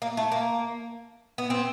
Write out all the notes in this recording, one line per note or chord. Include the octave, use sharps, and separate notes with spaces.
A#3
A3
A#3
B3
C4